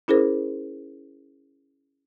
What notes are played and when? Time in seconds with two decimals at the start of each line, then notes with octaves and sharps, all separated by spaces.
0.08 C#4 E4 G#4 A#4 C5